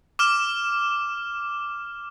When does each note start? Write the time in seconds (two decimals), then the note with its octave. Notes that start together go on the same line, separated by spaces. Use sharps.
0.19 D6 F6 E7